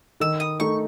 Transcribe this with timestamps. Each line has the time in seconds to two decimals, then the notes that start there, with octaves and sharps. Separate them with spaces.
0.20 D#3 E6
0.40 D#6
0.59 A3 D#4 C#6